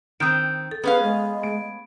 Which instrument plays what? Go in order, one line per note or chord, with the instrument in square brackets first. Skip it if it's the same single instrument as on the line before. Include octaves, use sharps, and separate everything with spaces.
[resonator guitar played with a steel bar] D#3 C4 [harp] D#6 G6 D7
[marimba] A4
[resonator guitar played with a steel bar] B3 C#4 F5 [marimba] G#4 [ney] B4
[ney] G#3
[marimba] A3 [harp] D7